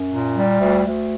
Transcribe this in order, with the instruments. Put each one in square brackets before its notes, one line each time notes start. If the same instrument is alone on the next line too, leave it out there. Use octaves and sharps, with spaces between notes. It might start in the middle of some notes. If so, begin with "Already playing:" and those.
Already playing: [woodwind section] F#2
A#2
G3
D2
D2